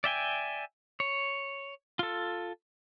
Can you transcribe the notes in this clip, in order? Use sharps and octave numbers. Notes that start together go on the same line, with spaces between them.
D5 E5 G5 G#5
C#5
F4 A4